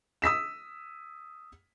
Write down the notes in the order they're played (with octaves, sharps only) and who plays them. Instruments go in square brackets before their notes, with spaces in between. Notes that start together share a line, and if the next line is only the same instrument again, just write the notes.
[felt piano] D#6 E6 B6 E7